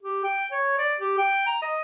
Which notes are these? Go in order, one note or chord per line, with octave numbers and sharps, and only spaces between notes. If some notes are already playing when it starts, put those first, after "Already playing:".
G4
G5
C#5
D5
G4
G5
A#5
D#5